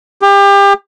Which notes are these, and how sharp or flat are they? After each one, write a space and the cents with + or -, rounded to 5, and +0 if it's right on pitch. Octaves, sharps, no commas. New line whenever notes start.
G4 +30